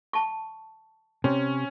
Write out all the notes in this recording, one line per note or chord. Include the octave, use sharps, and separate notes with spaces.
A5 C#6
C3 C#4